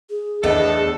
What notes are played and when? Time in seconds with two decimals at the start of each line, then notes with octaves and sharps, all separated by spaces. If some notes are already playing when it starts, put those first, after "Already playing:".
0.10 G#4
0.43 E2 A2 A3 B3 D4 D#4 A4